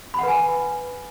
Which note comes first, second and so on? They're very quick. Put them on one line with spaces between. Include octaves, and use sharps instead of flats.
B5 F#5 B4 G#5